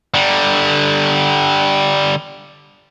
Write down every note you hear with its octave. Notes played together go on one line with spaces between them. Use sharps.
D3 G3